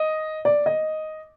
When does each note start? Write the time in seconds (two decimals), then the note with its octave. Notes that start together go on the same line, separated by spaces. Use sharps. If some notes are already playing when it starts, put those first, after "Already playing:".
Already playing: D#5
0.45 D5
0.66 D#5